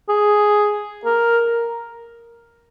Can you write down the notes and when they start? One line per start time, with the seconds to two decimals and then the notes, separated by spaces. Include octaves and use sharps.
0.09 G#4
1.05 A#4